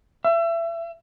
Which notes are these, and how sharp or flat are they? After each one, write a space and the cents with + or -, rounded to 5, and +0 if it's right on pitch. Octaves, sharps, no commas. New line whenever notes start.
E5 +30